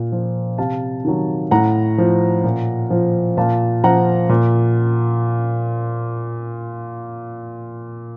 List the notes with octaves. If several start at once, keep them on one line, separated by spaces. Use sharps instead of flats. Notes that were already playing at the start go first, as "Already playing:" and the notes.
Already playing: A#2
F3
C3 F5 A5
D#3 F#3
A2 F#5 A#5
F3
A#2
F3
A#2 F5 A5
F3 F#5 A#5
A#2